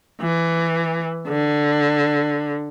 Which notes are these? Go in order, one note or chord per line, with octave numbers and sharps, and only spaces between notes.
E3
D3